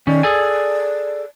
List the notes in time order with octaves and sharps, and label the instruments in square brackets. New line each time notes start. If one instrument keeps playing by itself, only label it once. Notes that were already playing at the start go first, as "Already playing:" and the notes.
[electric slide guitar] D#3 C#4 [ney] D5
[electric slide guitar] G#4 A4 G#5